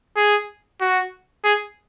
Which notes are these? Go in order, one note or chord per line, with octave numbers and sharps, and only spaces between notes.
G#4
F#4
G#4